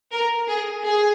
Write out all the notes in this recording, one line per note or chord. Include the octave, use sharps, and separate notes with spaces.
A#4
G#4
G#4